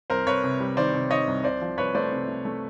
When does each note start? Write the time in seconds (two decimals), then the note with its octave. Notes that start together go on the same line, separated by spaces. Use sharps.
0.10 C2 A#4 C5
0.26 C2 B4 C#5
0.44 C3
0.60 G3
0.77 D#3 C5 D5
0.94 C3
1.10 D#3 C#5 D#5
1.27 C2
1.44 C2 C5 D5
1.61 F3
1.77 C2 B4 C#5
1.95 A3 C5 D5
2.12 C3
2.28 A3
2.45 A3